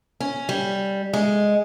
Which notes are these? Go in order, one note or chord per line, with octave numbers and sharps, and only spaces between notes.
C#4
G3
G#3